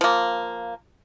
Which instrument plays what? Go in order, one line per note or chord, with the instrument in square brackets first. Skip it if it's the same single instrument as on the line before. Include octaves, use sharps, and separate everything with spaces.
[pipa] F3 A#3